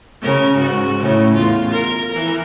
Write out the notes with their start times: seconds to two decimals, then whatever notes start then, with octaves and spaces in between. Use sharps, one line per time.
0.21 C#3 A#4
0.56 G#2 F#4
0.99 A2 C#3
1.35 E2 F4
1.71 A#4
2.11 E3 A#4